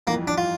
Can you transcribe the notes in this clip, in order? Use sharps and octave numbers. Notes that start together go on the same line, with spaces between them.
G1 F2 E3 A#3
D4
F4